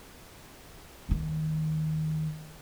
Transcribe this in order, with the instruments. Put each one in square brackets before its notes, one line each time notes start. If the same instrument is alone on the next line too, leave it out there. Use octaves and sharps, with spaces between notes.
[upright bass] D#2 D#3